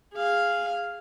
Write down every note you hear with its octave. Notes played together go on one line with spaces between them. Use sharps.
G#4 F5